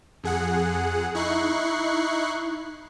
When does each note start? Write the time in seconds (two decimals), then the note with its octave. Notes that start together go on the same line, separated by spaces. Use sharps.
0.24 F2 G#4 F#5
1.15 D#4 E4 C#6 F#6 C7